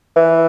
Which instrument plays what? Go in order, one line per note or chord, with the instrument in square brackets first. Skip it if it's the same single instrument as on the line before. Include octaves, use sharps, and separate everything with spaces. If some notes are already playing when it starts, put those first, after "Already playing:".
[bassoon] E3